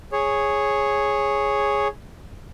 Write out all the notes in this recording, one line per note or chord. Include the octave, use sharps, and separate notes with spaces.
G#4 C#5